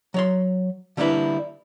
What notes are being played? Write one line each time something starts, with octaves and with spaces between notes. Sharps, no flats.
F#3 C#5 C6
D3 G3 A#3 D4 E4 B4